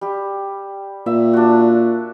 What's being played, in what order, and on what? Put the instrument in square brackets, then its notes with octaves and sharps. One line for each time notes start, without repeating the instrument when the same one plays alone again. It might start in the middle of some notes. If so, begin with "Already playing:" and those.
[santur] G3 G4
[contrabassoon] A#2 [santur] E5
[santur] D4 F#4